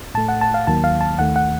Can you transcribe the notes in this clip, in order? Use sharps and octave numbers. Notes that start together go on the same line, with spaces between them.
A2 A3 A5
F#5
A5
F5
D#2 D#3 F#3 A#3 A5
F5
A5
D#2 D#3 A3 F#5
F#5